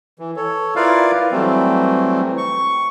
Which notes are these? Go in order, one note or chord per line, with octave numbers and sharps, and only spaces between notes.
E3
A4 C#5
E4 F4 A#4 B4 D5 F5
E3 F#3 G3 A3 C4
C#6